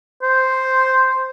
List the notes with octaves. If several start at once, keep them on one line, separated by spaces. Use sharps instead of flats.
C5